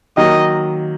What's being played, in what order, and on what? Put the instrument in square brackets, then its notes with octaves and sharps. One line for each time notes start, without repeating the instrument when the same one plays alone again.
[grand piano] D#3 F#3 A#3 [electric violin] D#5